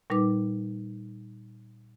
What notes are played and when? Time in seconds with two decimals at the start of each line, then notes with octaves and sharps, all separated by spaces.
0.10 A#2 G3 D#4 B4 D6